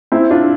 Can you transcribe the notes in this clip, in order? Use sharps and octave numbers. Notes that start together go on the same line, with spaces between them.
C4 E4
D4 F4